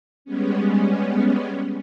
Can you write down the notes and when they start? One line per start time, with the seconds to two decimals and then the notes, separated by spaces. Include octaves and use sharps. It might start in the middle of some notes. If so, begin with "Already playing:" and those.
0.25 G3 G#3 B3 C#4